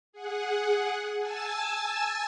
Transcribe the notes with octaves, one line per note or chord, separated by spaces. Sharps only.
G#4 F#5
G#5 A5 E6 A6